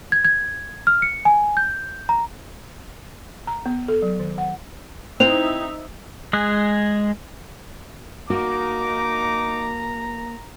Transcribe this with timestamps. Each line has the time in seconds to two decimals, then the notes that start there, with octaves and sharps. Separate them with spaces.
0.12 G#6
0.25 G#6
0.87 F6
1.02 C#7
1.25 G#5
1.57 G6
2.09 A#5
3.47 A#5
3.66 B3
3.88 A4
4.02 F#3
4.19 D#3
4.38 F#5
5.20 C4 D#4 E4 C5 E5 F7
6.33 G#3 G#4 F#6
8.30 A#3 D#4 F#4 A#5 D6